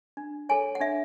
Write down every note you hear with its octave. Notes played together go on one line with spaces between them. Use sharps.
D4
A4 C#5 G#5
F#5
D4 E5